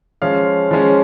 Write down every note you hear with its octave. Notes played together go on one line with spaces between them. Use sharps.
F3 G#3 C#4 F5
F3 G#3 C#4